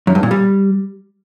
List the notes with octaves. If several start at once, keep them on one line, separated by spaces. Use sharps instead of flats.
F#2
G2
A#2
G3